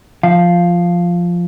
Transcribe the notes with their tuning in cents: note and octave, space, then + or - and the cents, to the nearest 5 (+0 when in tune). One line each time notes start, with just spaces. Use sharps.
F3 +0 F5 +0